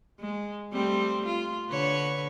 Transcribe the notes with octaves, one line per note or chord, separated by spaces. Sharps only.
G#3
G3 A3 C4
F4
D3 B4 C#5